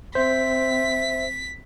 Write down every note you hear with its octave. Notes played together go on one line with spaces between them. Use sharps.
C4 C5 E5 B6